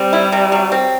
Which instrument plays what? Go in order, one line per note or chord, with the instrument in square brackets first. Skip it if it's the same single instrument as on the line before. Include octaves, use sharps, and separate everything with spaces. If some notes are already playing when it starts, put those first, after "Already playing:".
Already playing: [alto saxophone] G3 [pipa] C4
[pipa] E4
C3
F#3
C4